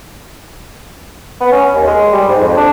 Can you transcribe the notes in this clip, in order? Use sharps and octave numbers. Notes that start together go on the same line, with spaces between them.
B3
C#4
D#2
G#3
G3
G#2
F2
D4